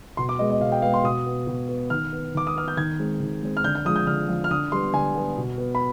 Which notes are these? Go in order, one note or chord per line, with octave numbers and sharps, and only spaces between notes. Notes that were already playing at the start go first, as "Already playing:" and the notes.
B2 C6
D6
G#3 B3 D#5
D#5
B2 F5
G5
G#3 B3 F5
C6
B2 D#6
B3
B2
B3
D#3 F6
B3
D#3 D6
D#6
B3 F6
G6
D#3 G#6
G#3 C4
D#3
G#3 C4
F6
D3 G6
G6
F3 G#3 D#6
G6
D3 F6
F3 G#3
F6
D3 D#6
G3 B3 C6
D3 G#5
G3 B3
B2
B3
B5